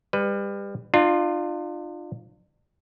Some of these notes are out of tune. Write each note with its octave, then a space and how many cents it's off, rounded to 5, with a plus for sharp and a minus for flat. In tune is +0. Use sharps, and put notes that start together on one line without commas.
G3 +30 B4 +15
D4 +45 F4 +0